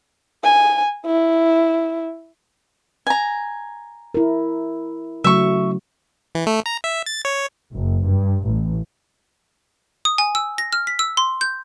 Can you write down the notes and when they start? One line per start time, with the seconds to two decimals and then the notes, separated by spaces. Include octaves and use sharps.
0.44 G#5
1.06 E4
3.07 G#5 A#5
4.14 E4 A#4
5.24 C#3 F#3 A3 E5 C#6
6.35 E3
6.47 A3
6.66 A#5
6.84 E5
7.06 A6
7.25 C#5
7.74 F#1
8.06 G2
8.46 A1
10.05 D#6
10.18 G#5
10.35 E6
10.58 A#6
10.73 F6
10.87 B6
10.99 E6
11.17 C6
11.41 G6